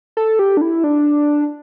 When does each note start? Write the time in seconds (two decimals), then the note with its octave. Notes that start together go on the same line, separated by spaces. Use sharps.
0.17 A4
0.39 G4
0.57 D4
0.61 E4
0.84 D4